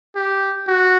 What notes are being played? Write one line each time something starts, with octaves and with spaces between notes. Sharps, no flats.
G4
F#4